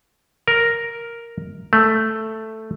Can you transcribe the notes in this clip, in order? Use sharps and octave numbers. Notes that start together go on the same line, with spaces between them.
A#4
A3